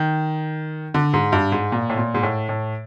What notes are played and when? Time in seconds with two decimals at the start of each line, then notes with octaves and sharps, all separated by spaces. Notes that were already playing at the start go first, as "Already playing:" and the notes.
Already playing: D#3
0.94 D3
1.14 G#2
1.32 G2
1.52 G#2
1.72 A#2
1.90 A2
1.97 A#2
2.14 G#2
2.23 A2
2.49 A2